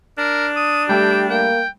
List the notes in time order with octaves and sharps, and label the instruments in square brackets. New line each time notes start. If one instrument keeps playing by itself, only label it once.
[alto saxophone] D4 [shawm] A#4
[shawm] D#6
[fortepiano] G3 A3 [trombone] G4 [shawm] G5
[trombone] A#3 [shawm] G5